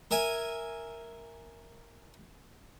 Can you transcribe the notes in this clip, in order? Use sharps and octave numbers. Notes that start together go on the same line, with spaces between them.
A#4 E5 G#5